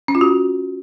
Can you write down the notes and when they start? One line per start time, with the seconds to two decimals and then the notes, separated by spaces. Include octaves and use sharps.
0.08 C#4
0.15 F4
0.21 F#4